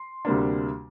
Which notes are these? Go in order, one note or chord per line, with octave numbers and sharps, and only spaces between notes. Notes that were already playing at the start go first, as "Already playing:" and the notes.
Already playing: C6
D2 C3 G3 A#3 D4